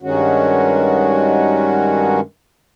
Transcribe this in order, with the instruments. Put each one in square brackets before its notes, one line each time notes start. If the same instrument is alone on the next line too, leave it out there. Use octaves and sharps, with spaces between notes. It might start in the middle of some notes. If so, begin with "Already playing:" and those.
[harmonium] G2 D#3 G#3 C#4 F#4